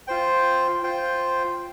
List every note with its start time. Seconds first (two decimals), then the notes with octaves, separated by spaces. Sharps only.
0.07 F4 C5 G5
0.83 F4 C5 G5